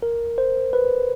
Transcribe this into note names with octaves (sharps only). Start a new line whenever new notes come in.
A#4
C5
B4